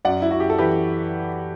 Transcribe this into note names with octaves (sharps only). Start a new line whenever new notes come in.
F#2 D5 F#5
E4
F#2 F#4
G4
A4
E3 G4 B4